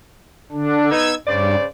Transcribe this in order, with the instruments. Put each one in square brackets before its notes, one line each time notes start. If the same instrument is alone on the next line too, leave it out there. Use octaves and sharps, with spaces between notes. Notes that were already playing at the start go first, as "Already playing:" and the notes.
[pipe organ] D3 D4
[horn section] B3 D#4 [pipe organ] E6 G#6
[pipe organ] G2 [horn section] C#3 C5 D5